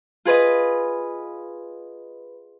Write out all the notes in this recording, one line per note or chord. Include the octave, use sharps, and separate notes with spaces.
F4 G#4 B4 D#5